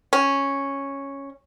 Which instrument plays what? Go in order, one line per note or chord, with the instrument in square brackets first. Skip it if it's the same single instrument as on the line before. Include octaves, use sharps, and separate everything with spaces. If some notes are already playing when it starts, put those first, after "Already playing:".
[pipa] C#4